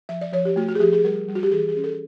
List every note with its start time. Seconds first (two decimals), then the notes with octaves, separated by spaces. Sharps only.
0.09 F3 E5
0.21 D5
0.33 F3 C#5
0.45 G4
0.56 A3 F#4
0.69 F#4
0.75 G#4
0.80 F3 G4
0.93 G#4
1.04 G3 A#4
1.28 G3
1.35 F#4
1.43 G4
1.52 E3 G#4
1.69 G#4
1.76 C#4
1.84 A4